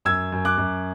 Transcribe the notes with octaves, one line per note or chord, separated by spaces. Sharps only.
F#2 E6 G#6
F#2
D6 F#6
F#2